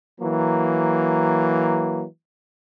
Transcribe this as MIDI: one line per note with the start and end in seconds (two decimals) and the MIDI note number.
0.20 2.04 52
0.20 2.04 54
0.20 2.04 58